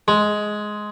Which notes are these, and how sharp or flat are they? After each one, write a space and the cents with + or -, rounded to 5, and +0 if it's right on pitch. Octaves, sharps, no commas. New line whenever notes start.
G#3 +10